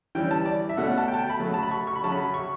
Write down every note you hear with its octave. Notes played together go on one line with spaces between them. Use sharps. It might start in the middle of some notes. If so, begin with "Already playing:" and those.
E3 G3 C#4 G5
A5
D5
E5
B2 A3 C#4 F#5
F#5
A5
G5
A5
G5
B5
C#3 F#3 A3 B5
A5
B5
C#6
C#6
B5
C#3 F#3 C#4 A5
B5
C#6